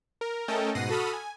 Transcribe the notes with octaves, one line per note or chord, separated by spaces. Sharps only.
A#4
A3 C#4 A4 A#4 D#5 G5
G#2 B2 F#5 A#6 C7 D#7
F#4 A4 B5 D#6 F6
G#5